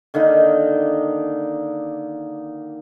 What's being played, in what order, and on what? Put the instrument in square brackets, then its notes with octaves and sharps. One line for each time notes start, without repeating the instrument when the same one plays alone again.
[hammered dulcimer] D3 D#3 A#3 D#4